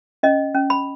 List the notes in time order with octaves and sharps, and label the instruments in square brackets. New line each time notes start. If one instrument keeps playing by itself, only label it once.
[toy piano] C#4 D#5
C#4
B5